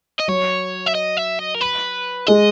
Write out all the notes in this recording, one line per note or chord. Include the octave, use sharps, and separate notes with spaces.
D#5
F#3 C#5
E5
D#5
E5
D#5
A#4
B4
G#3 D#5